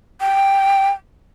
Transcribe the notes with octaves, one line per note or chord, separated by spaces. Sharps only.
G5